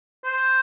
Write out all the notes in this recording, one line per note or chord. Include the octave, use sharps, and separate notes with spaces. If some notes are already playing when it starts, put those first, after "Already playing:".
C5